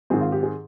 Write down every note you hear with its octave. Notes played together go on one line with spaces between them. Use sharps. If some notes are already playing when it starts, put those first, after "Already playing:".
G#2 D#3 G#3 C4 G#4
F4
G4
G#4